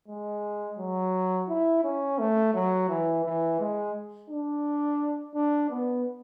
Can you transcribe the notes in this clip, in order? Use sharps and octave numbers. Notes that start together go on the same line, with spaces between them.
G#3
F#3
E4
C#4
A3
F#3
E3
E3
G#3
D4
D4
B3